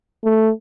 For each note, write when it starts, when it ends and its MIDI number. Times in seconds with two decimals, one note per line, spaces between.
0.24 0.50 57